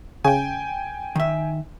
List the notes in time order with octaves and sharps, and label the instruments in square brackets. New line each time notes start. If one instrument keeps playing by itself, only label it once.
[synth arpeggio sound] C#3 [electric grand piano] G5 G#5
[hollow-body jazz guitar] D#3 E5